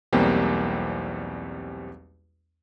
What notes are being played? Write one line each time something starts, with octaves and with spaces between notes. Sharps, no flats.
B1 E2 G3 A#3 C4 G4